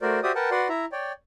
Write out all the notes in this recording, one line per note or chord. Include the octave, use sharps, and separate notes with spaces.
A3 F#4 A#4 C5 D5
F#4 G4 C5 D5 E5 D#6
A#4 B4 F#5 G5 A5
F#4 B4 D5 F#5 C6
E4 E5 A#5
C#5 D5 G5